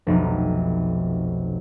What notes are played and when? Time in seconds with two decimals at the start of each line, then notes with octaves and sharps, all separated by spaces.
0.07 F1 B1